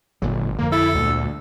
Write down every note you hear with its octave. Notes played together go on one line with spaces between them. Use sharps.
G#1 A#2 D3 F#3
F2 D3 A#3
E4 A4
D2 A#2 G#3